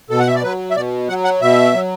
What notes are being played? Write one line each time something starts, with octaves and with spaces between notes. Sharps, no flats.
B2 A4
F#5
E5
D5
F#3 B4
E5
B2 D5
F#3 F#5
F#5
B2 E5
F#3